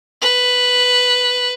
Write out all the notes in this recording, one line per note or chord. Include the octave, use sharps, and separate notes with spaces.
B4